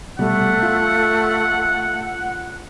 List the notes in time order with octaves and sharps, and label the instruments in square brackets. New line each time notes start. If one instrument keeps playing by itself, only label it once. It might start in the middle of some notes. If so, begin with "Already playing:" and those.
[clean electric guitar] C2 B2 G3 [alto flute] A3 [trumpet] F#5
[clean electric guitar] F4